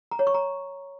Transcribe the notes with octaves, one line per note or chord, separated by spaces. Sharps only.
A#5
C#5
C#6
A#5